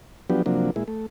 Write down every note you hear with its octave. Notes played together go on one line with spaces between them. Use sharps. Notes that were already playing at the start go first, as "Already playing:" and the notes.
F3 F#3 B3 D4 G4
C3 F3 F#3 A#3 D4
A#2 G#3 E4
A3